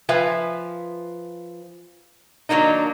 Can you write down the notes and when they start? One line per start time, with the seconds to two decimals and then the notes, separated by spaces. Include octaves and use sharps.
0.09 F3 B4 E5 F5 G#5
2.49 D#3 F#3 A#3 D4 D#4